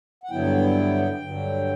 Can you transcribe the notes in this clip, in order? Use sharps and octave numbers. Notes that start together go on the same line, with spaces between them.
F#5
G2 D3 F#3 B3 E4 G5
G2 D3 F#3